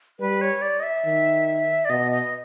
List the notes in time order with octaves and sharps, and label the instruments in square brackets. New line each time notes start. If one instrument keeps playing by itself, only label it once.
[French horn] G3 [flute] B4
[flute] C#5
D5
D#5
E5
[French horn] D#3
[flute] D5
[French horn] B2 [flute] D#5
[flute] D#5